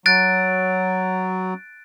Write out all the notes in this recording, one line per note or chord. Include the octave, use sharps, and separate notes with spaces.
F#3 F#6 A6 D7